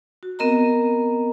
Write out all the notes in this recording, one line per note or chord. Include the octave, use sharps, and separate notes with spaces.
F#4
B3 C4 A#4 D#5 A#5